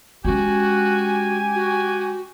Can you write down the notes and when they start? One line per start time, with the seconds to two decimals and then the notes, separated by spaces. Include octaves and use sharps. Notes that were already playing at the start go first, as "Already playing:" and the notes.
0.25 G#3 C#4 F#4 G4 G#5
1.54 F#4